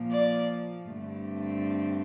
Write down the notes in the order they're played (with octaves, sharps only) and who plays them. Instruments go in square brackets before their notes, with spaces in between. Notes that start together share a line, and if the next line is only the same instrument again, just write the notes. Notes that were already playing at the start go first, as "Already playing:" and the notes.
Already playing: [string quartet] A#2 F3 A#3
D5
G2 D3 A3 C4